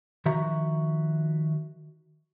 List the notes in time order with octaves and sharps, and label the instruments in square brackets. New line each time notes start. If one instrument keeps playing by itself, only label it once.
[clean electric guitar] D#3 F3 F#4 E5 A#5